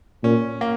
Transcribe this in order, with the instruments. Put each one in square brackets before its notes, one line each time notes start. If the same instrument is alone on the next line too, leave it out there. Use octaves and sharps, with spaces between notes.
[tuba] A#2 [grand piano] C#4
[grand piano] A#3